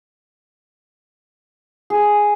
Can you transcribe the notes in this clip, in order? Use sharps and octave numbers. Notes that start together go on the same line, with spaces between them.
G#4